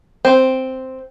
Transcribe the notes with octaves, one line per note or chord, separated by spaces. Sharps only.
C4